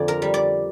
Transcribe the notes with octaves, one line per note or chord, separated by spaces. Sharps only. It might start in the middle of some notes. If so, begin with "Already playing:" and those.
Already playing: F2 D3 D5
A#4
G3
D5